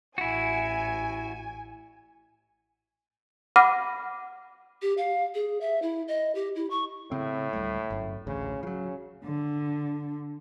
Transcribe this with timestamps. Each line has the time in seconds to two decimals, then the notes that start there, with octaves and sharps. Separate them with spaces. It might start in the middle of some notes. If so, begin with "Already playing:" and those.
0.18 A1 E4 F#4 G#5
3.56 F#5 B5 D6 F6 A#6 D#7
4.82 G4
4.98 F5
5.34 G#4
5.61 E5
5.82 E4
6.08 D#5
6.35 G4
6.56 E4
6.70 C#6
7.12 A2 C#3 C4
7.53 D2 G3 A3
7.90 G1 F#2
8.27 A1 D2 C#3
8.63 C#3 F3 F#3
9.25 D3